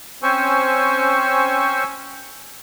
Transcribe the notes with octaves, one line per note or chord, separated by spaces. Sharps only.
C4 C#4 C5 G#5 C#6 E6